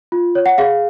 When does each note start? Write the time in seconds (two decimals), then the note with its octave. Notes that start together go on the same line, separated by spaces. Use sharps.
0.12 F4
0.35 C#5
0.46 F#5
0.58 G#4 F5